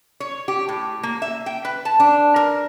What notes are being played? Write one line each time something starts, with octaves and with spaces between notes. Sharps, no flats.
C#5
G4
A2
A#3
E5
G5
B4
A5
D4
A#4